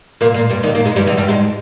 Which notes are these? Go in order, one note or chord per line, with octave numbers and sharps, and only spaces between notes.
A#2 A#3
A#2 A#3
G2 G3
D#2 D#3
A#2 A#3
G#2 G#3
G2 G3
E2 E3
G2 G3
G#2 G#3